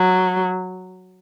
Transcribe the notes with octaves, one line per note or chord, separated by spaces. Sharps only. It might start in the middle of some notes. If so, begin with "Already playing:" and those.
Already playing: F#3